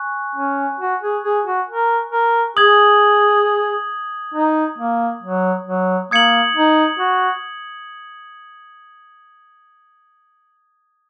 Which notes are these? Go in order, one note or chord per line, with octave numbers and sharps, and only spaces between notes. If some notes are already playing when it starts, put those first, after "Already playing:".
Already playing: G#5 C#6 F#6
C#4
F#4
G#4
G#4
F#4
A#4
A#4
G#4 D#6 G#6 F#7
D#4
A#3
F#3
F#3
A#3 D#6 G#6 C#7 F#7
D#4
F#4